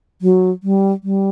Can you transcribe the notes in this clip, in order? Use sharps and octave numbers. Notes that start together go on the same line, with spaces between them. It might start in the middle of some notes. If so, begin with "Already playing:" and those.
F#3
G3
G3